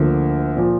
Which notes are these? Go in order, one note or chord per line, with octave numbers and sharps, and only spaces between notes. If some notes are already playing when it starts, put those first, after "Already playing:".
Already playing: D2 D3 F3 A#3
A#2 F3